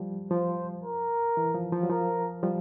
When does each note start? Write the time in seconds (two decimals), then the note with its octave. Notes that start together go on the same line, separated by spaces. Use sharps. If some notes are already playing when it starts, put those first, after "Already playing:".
Already playing: F3 G3
0.31 F3 C5
0.84 A#4
1.37 E3
1.55 F3
1.73 F3
1.83 F#3
1.90 F3 A#4
2.43 F3 G3